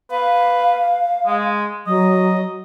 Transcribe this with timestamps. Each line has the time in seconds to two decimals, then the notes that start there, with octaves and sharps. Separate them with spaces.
0.11 B4 F5
1.26 G#3
1.87 F#3 D#5